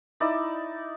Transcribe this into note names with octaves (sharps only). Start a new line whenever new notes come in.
D#4 E4 D5